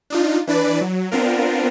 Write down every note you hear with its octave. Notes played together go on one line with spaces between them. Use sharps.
D4 D#4 F4
E3 D4 B4 D5
F#3
B3 C4 D4 F4 A#4